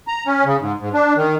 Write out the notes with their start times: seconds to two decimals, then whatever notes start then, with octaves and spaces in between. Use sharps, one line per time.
0.07 A#5
0.26 C#4
0.44 C#3
0.60 G#2
0.80 G#2
0.93 D4
1.16 D#3